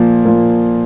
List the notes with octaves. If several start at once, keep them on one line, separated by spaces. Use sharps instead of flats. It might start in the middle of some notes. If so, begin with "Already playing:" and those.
Already playing: A#2 F3 A#3
A#2 F3 A#3